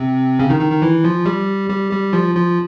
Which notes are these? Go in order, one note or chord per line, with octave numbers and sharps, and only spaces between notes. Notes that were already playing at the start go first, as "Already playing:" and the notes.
Already playing: C3 C4
C#3 C#4
D#3 D#4
D#3 D#4
D#3 D#4
E3 E4
F3 F4
G3 G4
G3 G4
G3 G4
F3 F4
F3 F4